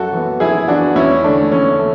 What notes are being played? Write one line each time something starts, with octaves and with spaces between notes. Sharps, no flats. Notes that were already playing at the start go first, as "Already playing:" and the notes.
Already playing: F#2 F#4 A4
E3 B3
F#2 E4 G#4
E3 B3 D4 F#4
E2 C#4 E4
D3 A3 D4
E2 C#4
A3